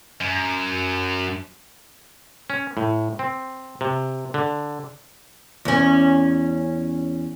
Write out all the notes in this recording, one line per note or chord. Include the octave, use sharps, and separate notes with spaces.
F#2
C#4
A2
C4
C3
D3
E2 C#4